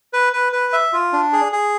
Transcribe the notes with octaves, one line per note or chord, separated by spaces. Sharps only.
B4
B4
B4
E5
F4
D4
G#4
G#4